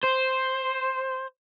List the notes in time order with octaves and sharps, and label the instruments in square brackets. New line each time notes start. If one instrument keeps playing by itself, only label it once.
[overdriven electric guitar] C5